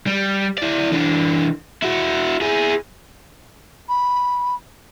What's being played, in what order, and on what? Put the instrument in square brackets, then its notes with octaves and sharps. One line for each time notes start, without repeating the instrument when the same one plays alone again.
[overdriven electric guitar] G3
E4 D5
E3 D4
E4 F#4
E4 G#4
[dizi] B5